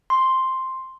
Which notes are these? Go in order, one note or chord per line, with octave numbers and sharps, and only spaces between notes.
C6